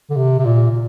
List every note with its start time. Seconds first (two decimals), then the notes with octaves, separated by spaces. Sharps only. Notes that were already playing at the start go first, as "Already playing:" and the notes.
0.10 D3
0.17 C3
0.39 C3
0.45 A#2
0.71 A#2